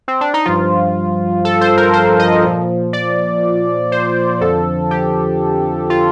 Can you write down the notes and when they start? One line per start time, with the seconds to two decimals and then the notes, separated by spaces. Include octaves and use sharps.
0.08 C4
0.21 D4
0.34 D#4
0.45 G2 F3 F4
1.45 A4
1.61 C5
1.77 A#4
1.93 C5
2.19 D#5
2.44 A#2 F3
2.93 D5
3.92 C5
4.41 F2 D3 F3 A4
4.91 G4
5.90 F4